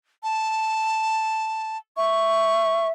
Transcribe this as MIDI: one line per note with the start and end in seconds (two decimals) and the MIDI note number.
0.23 1.78 81
1.97 2.92 76
1.97 2.87 85